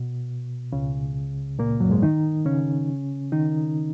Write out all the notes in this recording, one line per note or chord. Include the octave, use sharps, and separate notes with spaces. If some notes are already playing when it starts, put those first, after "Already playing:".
Already playing: B2
C#2 C#3
A#2 A#3
F#2 F#3
G#2 G#3
D#3 D#4
C#3 C#4
D#3 D#4